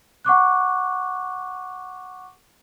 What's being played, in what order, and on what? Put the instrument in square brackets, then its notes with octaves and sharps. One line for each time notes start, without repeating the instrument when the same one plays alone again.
[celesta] F#5 C#6 D6 F#6